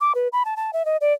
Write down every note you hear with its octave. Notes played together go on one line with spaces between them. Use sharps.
D6
B4
B5
A5
A5
E5
D#5
D5